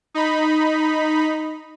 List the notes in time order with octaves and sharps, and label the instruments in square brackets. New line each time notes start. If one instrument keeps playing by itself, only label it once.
[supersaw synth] D#4 B5